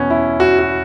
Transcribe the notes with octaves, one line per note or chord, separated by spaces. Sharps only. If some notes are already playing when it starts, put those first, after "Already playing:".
Already playing: E2 B2 B3 C#4
E4
F#4
F#4